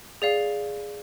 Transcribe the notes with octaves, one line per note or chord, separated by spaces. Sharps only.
G#4 D5 F5